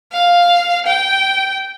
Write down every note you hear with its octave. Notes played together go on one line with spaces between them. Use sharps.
F5
G5